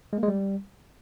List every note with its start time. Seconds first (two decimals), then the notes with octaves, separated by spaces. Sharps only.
0.13 G#3
0.18 A#3
0.23 G#3
0.28 G3